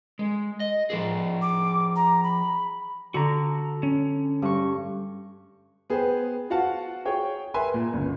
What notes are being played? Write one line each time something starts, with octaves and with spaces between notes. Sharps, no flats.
G#3
D#5
F3 F4 G#4
D6
A#5
B5
D3 F#4 A#5
C#4
G2 C#6
B3 G#4 B4 C5 G5
F4 F#4 F5 F#5 A5
G#4 C#5 G5
A#4 B4 E5 G#5 B5 C6
A#2
G1 C#2